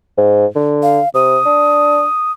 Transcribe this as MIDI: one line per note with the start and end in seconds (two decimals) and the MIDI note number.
0.18 0.46 44
0.55 1.00 50
0.83 1.09 77
1.14 1.39 48
1.14 2.32 87
1.46 2.04 62